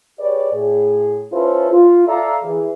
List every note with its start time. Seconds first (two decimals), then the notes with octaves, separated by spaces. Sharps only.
0.19 G4 G#4 B4 C#5 D5
0.52 A2 G#4
1.33 C#4 E4 F4 A4 B4 C5
1.71 F4
2.07 A4 D5 E5 F5 A#5
2.43 E3 G#4